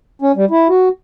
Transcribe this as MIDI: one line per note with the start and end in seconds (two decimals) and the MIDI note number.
0.22 0.32 61
0.36 0.45 55
0.51 0.68 64
0.69 0.89 66